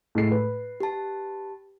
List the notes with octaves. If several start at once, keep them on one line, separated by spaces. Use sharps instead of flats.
A2 G#3 C7
B4
G4 A5